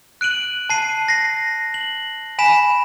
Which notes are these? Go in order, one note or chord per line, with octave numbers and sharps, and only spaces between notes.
F#6 D7 D#7 F#7
A5 C7 D#7
A#6 C7
F#7
G#5 B5 B6 E7